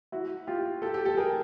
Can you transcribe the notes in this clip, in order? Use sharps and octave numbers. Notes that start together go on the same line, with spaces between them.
E4 F#4
F4 G4
G4 A4
G4 A4
G4 A4
G#4 A#4